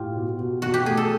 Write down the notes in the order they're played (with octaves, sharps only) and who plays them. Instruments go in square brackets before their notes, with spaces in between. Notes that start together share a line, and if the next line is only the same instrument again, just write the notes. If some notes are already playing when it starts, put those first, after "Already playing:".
Already playing: [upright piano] A2 [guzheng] F4 G4
[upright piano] B2
B2
[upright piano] B2 [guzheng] F#4
[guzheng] G4
[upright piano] A3 [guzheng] G#4
[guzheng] A4